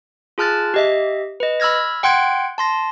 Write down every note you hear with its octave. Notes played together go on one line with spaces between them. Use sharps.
F4 G#4 A5 F6 F#6 A6
G4 D#5 E5
B4 D#5
B5 E6 F6 G#6 A#6
F#5 G5 C6 F#6 G#6 D7
A5 C6 A#6